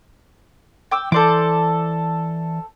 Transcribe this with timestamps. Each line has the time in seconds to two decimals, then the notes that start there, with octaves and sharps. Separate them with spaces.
0.91 G5 D6 E6
1.12 E3 A4 C5 D5 D6